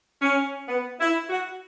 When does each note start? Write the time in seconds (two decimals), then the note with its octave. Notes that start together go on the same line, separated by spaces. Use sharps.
0.22 C#4
0.68 B3
1.00 E4
1.30 F#4